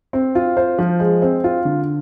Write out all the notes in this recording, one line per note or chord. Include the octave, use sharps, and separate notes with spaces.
C4
F4
C5
F3
G#3
C4
F4
D3